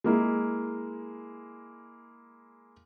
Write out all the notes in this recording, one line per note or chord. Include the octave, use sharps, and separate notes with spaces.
G#3 A#3 E4